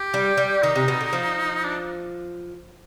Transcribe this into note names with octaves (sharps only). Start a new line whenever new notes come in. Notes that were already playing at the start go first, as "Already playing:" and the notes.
Already playing: G4
G3
G3
D#3 D#4
C3
B2
D3
F3
D4